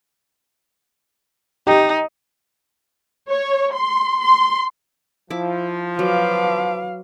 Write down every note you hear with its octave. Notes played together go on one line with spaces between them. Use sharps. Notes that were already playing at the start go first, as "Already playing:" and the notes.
D#4 G4
C#5
C6
C6
F3 E4 D6
F#3 B4 F5 D6